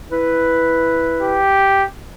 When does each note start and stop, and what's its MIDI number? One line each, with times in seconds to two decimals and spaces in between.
0.11 1.38 64
0.11 1.38 71
1.22 1.84 67